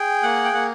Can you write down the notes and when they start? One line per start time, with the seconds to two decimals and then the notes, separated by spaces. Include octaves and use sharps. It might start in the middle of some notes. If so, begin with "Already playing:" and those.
Already playing: G#4 G5
0.23 A#3 F#5
0.44 G5
0.53 A#3 F#5